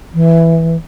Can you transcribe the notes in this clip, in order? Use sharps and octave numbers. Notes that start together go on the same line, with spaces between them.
E3